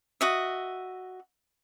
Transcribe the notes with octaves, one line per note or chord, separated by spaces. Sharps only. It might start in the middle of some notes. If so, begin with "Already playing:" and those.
F#4 D#5 E5